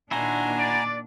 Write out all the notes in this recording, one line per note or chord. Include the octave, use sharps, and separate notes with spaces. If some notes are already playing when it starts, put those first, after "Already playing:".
A#2 D#3 D4 E4 F#4 C5 G#5 A#5
D5